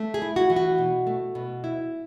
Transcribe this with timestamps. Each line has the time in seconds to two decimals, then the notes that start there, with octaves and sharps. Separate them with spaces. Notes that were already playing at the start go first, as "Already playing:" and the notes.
Already playing: A3
0.14 G#4
0.22 E4
0.36 F#4
0.50 E3
0.56 F#4
0.78 B2
1.07 A3
1.35 B2
1.64 E4